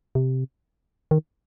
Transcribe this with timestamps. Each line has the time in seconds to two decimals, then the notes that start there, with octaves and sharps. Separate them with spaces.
0.15 C3
1.11 D#3